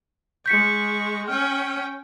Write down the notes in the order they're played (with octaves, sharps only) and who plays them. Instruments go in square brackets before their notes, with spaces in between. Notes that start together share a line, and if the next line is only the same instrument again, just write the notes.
[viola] G#3 C#6 [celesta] G6 B6 C#7
[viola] C#4 G5 [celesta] F6